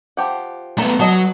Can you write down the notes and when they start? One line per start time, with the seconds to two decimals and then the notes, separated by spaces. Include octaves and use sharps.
0.17 F3 G4 F#5
0.78 A3 B3 A#5
1.00 F#3 B3 A4 D#5